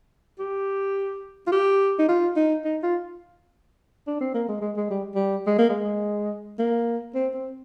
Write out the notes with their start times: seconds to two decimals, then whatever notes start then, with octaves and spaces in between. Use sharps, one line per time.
0.39 G4
1.47 F4
1.52 G4
1.99 D#4
2.09 F4
2.36 D#4
2.64 D#4
2.83 F4
4.07 D4
4.21 C4
4.34 A#3
4.48 G#3
4.62 G#3
4.77 G#3
4.91 G3
5.15 G3
5.47 G#3
5.59 A#3
5.70 G#3
6.59 A#3
7.15 C4
7.34 C4